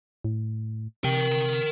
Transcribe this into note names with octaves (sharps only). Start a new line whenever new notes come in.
A2
C3 A#4 G5